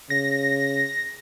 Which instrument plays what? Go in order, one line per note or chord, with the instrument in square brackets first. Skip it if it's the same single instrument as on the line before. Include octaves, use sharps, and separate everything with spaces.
[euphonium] C#3 [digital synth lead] A#6